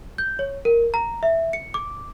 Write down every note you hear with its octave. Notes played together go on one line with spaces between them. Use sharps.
G6
C#5
A#4
A#5
E5
C#7
D6